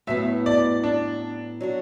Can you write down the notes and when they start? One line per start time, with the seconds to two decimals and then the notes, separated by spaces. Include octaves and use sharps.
0.07 A2 F#3 B3 E5
0.46 D5
0.84 D4
1.61 F#3 D4 F#4